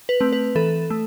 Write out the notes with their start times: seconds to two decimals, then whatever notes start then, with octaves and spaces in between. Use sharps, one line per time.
0.09 B4
0.21 A3 C4
0.33 B4
0.55 E3 A4
0.90 A3